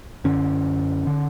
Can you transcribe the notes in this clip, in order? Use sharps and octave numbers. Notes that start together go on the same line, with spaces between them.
F#2 D3 C#4
D3